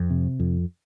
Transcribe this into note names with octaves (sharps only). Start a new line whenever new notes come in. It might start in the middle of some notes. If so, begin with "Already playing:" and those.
Already playing: F2
C3
F2